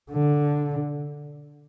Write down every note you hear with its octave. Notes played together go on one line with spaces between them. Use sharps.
D3